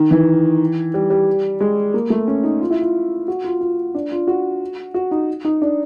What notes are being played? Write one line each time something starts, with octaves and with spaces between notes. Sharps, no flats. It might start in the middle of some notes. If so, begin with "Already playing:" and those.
Already playing: D#3
E3
G3
G3
G#3
A#3
A3
C#4
D#4
F4
E4
F4
F#4
F4
F4
D4
F4
F#4
F#4
D#4
D#4
D4